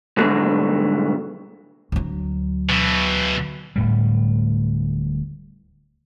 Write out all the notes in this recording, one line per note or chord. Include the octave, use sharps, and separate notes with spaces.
G#2 B2 D3 F#3 G3 A3
D2 F#3
B2 E3
D1 A2 G3